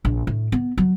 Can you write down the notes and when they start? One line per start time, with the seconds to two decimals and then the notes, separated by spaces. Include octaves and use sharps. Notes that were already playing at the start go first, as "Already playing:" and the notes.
0.05 A#1
0.27 A2
0.52 B3
0.78 F#3